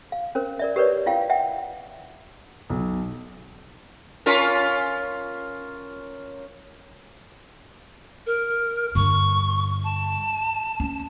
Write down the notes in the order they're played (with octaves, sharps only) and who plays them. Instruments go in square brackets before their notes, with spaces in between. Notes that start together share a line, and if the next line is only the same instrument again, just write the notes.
[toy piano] F5
C#4 A#4 C5
A#4 D5 E5
G4 A#4 B4 C#5 D5
E4 F4 F5 G5
E5 F#5 G5
[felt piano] B1
[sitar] C#4 F4 A#4
[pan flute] A#4
[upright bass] G2 D3 [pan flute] C#6
[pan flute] A5
[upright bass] C#4